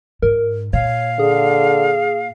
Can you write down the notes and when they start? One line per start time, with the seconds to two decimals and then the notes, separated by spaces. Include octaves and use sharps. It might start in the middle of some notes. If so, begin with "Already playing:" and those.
0.22 G#2 A#4
0.73 A#2 C#5 F5
1.19 D3 G#4